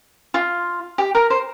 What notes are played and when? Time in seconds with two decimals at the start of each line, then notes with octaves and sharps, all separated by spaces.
0.34 F4
0.98 G4
1.15 A#4
1.30 C5